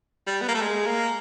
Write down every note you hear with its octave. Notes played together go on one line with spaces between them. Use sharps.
G3
B3
A#3
A3
G#3
A#3